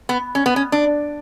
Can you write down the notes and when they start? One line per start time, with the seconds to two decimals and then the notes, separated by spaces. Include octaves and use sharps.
0.09 B3
0.35 C#4
0.46 B3
0.56 C#4
0.72 D4